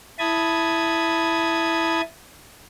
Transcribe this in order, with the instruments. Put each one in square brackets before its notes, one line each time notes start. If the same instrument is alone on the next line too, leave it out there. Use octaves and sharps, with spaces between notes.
[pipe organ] E4 A5 B5 D#6 G#6